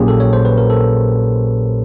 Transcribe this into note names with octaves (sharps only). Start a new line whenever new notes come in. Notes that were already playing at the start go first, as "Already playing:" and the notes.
Already playing: A#1 A#2 F#3 A#3 C#4 G4 G#4
A4
C#5
C5
B4
A#4
A4